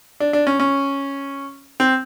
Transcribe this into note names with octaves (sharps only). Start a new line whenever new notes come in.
D4
D4
C#4
C#4
C4